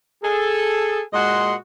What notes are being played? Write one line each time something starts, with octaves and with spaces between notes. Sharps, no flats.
G#4 A4
A#2 G#3 F#4 D#5 F#5 C6